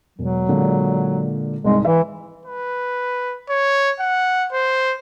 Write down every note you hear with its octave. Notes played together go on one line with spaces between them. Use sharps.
E1 F#3
A#2 D3 G#3
C2 G#2 G#3
E3 E5
B4
C#5
F#5
C5